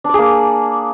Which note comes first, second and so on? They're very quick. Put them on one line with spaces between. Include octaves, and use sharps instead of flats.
D4 D5 G#4 A#3